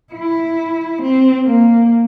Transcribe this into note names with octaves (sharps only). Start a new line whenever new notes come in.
E4
C4
A#3